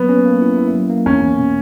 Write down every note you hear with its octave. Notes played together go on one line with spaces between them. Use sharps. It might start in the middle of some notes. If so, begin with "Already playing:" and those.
Already playing: F#3 A#3 B3
C#4
A#3
E4
E4
F#3
A#3
E2 C#4
E2
B2